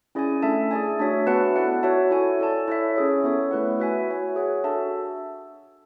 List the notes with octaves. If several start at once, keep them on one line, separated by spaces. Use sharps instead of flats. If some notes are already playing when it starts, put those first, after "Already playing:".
C#4 E4 G#4 D5 G#5
A3 D4 A4 E5 A5
G#4 D5 G#5
A3 D4 F#4 C#5 E5
B3 F#4 B4 F#5 A5
E4 A4 D5 F#5
F#4 C#5 E5 A5
E4 A4 C#5 G#5
E4 A4 D5 A5
E4 A4 C#5 E5
C#4 G#4 C#5
B3 E4 A4 C#5
A3 E4 B4 F#5
F#4 B4 E5 G#5
F#4 C#5 G#5
G#4 C#5 F#5
D4 F#4 A4 E5 A5